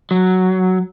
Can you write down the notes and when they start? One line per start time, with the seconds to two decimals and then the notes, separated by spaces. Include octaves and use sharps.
0.11 F#3